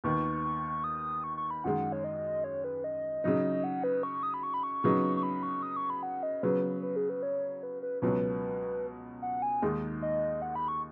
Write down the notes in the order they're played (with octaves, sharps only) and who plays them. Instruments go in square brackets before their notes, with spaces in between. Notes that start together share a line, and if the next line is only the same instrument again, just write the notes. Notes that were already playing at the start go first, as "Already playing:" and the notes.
[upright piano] D#2 D#3 B3 [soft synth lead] C#6
[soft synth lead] D#6
C#6
C#6
B5
[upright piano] F#2 D#3 G#3 [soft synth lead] F#5
[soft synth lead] C#5
D#5
C#5
B4
D#5
[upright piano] C#3 F#3 D#4
[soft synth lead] F#5
B4
C#6
D#6
B5
C#6
B5
C#6
[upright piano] C#3 F#3 B3 D#4
[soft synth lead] C#6
B5
C#6
D#6
C#6
B5
F#5
D#5
[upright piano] C#3 F#3 B3 [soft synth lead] B4
[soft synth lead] B4
G#4
B4
C#5
B4
B4
[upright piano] C#2 B2 F#3 C#4 [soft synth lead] B4
[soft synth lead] F#5
G#5
[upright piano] D#2 D#3 G#3 D#4
[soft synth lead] D#5
F#5
B5
C#6